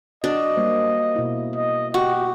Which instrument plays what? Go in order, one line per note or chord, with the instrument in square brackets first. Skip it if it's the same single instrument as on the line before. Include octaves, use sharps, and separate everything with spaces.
[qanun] D4 [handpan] F#4 [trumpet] D#5
[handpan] G3 A#3 C5
B2 E4
[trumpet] D#5
[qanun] F#4 [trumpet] G4